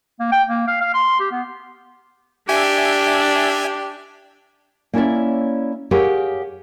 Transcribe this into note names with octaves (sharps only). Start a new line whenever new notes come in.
A#3
G5
A#3
F5
F5
C6
G4
B3
D4 G4 E5 G#5 G#6
A#3 C#4 E4 C#5 D5 E5
G4 G#4 A#4 C#5 F5 F#5